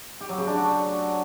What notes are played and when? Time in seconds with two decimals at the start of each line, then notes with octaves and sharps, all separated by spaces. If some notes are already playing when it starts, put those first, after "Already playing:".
0.21 G4
0.29 F#3
0.38 C#3
0.47 D4
0.55 F#4